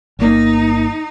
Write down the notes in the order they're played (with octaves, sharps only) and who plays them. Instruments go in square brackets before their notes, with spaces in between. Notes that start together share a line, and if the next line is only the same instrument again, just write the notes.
[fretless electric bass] G1 A#3 [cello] D#4